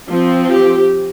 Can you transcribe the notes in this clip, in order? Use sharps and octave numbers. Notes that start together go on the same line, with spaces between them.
F3 C4
G4